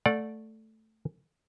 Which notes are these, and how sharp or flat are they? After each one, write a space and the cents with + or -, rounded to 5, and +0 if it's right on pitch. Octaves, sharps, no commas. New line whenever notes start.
A3 +0 D5 +0 F#5 -35